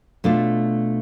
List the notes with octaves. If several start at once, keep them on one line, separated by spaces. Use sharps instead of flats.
B2 A3 D4 F4